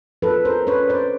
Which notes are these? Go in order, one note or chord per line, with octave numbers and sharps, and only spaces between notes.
F3 A4 B4
A#4 C5
C#4 B4 C#5
C5 D5